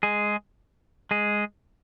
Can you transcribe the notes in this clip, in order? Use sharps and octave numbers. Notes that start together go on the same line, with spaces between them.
G#3 G#4
G#3 G#4